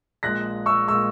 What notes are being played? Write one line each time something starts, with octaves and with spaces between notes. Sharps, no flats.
A#1 A#2 G#3 F#6 A#6
C#6 E6
A#2 G#3 C#6 E6